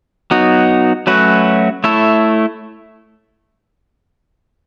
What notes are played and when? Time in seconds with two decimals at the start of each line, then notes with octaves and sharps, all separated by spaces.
0.31 F#3 B3 D#4 F#4
1.07 F#3 A3 C#4 F#4 B4
1.84 A3 E4 A4 C#5